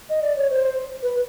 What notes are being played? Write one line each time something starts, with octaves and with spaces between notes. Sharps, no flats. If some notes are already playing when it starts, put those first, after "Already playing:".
D#5
D5
C#5
C5
B4